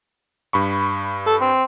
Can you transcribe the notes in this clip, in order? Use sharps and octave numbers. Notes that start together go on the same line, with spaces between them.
G2 B5 C#6
A4
C4